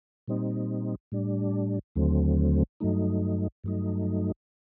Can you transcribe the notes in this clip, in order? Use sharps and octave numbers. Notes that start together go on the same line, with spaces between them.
A#2 G3 C4 D#4
A2 G3 D4
D#2 D3 F#3 A3 C4
G2 F#3 A3 D#4
G2 F#3 A3 D#4